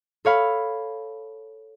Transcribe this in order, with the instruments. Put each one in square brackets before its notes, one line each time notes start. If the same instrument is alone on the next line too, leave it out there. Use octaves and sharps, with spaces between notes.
[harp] A4 C#5 F5 B5